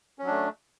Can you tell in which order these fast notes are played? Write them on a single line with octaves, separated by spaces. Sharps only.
C#4 F#3 D4 A3